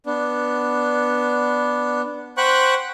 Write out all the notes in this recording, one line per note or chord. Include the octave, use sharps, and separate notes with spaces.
B3 D4
C5 F#5 G5 B5 C#6 F#6